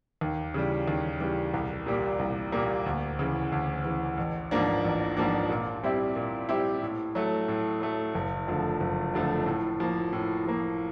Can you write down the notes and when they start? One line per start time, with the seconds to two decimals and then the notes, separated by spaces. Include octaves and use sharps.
0.21 D#2
0.54 C#3 E3 G3
0.88 D#2
1.21 C#3 E3 G3
1.54 C2
1.86 A#2 G3 A#3
2.19 C2
2.52 A#2 G3 A#3
2.86 D2
3.19 C#3 E3
3.52 D2
3.85 C#3 E3
4.17 A1
4.51 G#2 F3 A#3 D4
4.85 A1
5.17 G#2 F3 A#3 D4
5.49 A#2
5.83 G3 C4 E4 G4
6.16 A#2
6.49 G3 C4 E4 G4
6.83 A2
7.15 F#3 A3
7.48 A2
7.81 F#3 A3
8.15 F#1
8.47 F2 D3 F3 A3
8.80 F#1
9.14 F2 D3 F3 A3
9.46 A2
9.80 F3 A#3
10.13 A2
10.45 F3 A#3